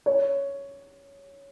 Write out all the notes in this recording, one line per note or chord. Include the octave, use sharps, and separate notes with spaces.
C#5